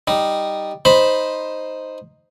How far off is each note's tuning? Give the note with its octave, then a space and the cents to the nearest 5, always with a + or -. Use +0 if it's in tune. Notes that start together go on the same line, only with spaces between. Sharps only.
G3 +0 D#4 -5
D#4 +0 C5 +0 B5 +0